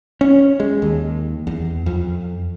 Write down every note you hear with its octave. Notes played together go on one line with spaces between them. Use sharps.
C#4
G#3
D#2
E2
F2